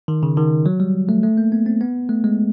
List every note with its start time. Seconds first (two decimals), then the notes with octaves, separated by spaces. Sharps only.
0.08 D#3
0.23 C#3
0.37 D#3
0.66 F#3
0.80 G3
1.09 A3
1.23 A3
1.37 A#3
1.52 B3
1.66 C4
1.81 B3
2.09 A3
2.24 G#3